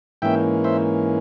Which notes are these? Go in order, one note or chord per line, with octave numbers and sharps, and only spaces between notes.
G#2 E3 A#3 C#4 E5 G5
C5 E5